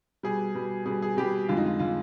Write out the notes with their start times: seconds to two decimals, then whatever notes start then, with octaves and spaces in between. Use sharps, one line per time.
0.23 B2 G3 G#4
0.55 B2 G3
0.86 B2 G3 G#4
1.02 G#4
1.17 B2 G3 G4
1.48 F2 D3 G#3 F4
1.57 D#4
1.66 F4
1.79 D3 G#3 F4